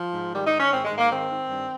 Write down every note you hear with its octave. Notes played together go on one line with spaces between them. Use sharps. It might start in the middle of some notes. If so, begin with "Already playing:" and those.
Already playing: F3
G#2
D#3 G3
D#4
D#3
C#4
G#2 C4
G#3
G#2
A#3
D#3 C4
D#3
G2